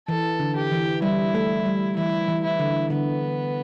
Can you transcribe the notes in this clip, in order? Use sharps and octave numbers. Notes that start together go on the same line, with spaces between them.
E3 A4
D3
G4
E3
G3 E4
A3
G3
E3 E4
E3
E4
D3
D3 B3